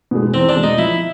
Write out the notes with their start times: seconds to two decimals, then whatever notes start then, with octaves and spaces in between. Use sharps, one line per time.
0.11 B2 G#3
0.34 E2 C4
0.49 D4
0.56 B2 G#3
0.63 D#4
0.78 F3 E4